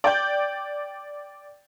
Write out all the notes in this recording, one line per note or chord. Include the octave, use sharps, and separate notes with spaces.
D5 G5 G6